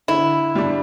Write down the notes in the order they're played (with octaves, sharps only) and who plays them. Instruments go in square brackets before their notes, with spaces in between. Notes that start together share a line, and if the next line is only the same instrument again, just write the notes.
[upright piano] D3 [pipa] E4
[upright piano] G3 D4